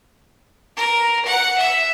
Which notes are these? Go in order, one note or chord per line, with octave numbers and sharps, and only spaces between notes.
A#4
F#5
E5